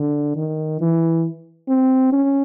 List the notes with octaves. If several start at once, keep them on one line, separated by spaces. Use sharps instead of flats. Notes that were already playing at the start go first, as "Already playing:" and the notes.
Already playing: D3
D#3
E3
C4
C#4